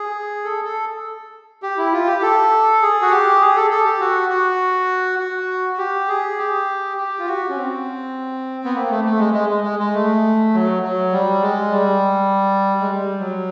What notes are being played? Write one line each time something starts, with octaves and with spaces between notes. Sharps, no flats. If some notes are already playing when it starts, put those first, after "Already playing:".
Already playing: G#4
A4
A4
G4
E4
F4
G4
A4
G#4
F#4
G4
G#4
A4
A4
G4
F#4
F#4
F#4
F#4
G4
G#4
G4
G4
F4
F#4
C#4
C4
B3
A#3
A3
A3
G#3
G#3
G#3
G#3
G#3
A3
F#3
F#3
G3
G#3
G3
G#3
G3
F#3